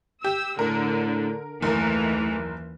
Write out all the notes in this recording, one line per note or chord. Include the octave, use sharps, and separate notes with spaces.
G4 E6
A2 D3 A#4
F#1 D#2 E3 A3 A#4